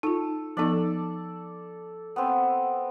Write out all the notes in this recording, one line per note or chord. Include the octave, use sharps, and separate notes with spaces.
D#4 F4 A4
F3 B3 D#4 A4 D5
B3 C4